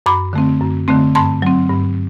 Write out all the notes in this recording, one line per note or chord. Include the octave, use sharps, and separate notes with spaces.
F#2 B5 D6
D3 A3 C4
F#2
D3 A3 C4
G2 A5 C6
F#3 C4
G2